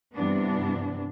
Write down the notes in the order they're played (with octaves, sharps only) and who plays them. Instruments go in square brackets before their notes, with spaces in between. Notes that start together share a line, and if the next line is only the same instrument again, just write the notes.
[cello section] G2 C3 E3 B3 D4